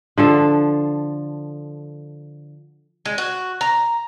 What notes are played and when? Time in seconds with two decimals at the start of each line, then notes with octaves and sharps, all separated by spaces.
0.18 D3 F3 A4
3.05 G#3
3.18 F#4
3.61 A#5